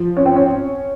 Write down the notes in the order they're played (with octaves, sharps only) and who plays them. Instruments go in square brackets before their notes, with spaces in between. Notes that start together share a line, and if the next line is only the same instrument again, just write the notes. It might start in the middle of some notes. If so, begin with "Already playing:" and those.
Already playing: [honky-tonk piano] F3
C#4
C4
C#4